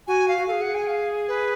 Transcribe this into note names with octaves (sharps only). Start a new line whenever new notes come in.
F#4 G#5
F5
F#4
G#4 A4 F5
F#5
G#5
F5
B4